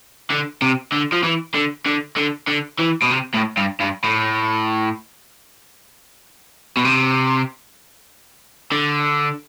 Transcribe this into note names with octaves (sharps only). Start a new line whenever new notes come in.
D3
C3
D3
F3
E3
D3
D3
D3
D3
E3
B2
C3
A2
G2
G2
A2
B2
C3
D3